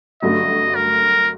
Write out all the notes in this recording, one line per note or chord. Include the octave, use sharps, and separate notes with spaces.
G2 D3 F#3 A3 D#5
A#4